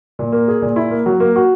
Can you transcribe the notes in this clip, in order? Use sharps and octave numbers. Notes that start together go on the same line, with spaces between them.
A#2
A#3
G#4
A#2
E4
A#3
F#3
A#3
F#4